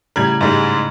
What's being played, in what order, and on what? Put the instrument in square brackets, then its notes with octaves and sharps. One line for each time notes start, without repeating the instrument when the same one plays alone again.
[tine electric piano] A2 C#3 A#5 [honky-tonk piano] G3 G#6
[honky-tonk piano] G#2 G3 G#3